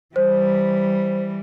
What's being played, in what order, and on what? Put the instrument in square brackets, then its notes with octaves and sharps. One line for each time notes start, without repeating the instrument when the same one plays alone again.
[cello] E3 G3 [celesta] C5